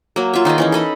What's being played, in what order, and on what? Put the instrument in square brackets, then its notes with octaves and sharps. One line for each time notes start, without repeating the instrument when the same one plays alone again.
[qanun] F#3 A#3
F4 E5
D#3 D#4 G#4 D#5
E3 C#4 D#4
A4 D#5 B5